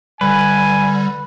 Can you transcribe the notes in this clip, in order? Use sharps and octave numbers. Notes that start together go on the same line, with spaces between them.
D3 G3 B4 G#5